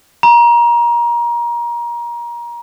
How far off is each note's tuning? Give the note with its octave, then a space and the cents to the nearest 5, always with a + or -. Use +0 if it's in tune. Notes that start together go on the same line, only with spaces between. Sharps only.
A#5 +25